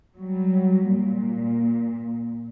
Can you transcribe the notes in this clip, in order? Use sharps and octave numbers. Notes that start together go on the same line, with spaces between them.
F#3 G3
A#2